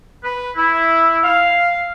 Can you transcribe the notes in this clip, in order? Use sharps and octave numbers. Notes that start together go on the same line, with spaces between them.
B4
E4
F5